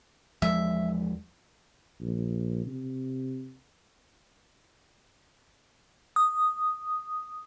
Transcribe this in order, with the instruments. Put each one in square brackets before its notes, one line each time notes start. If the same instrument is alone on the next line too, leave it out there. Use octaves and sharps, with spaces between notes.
[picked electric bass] E2 F3 G#3 [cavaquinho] E5
[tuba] A#1
C3
[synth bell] D#6